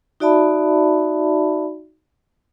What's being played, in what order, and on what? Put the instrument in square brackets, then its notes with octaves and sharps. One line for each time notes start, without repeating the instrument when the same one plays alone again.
[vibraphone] D#4 F#4 D5 E5 A5 B5